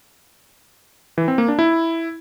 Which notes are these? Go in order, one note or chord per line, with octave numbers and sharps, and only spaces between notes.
E3
C4
A#3
D4
E4